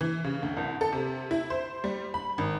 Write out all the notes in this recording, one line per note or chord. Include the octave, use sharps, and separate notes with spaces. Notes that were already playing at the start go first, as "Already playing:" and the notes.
E3
C#3
D2
C2
A4
C3
E4
C5
G3
B5
G#1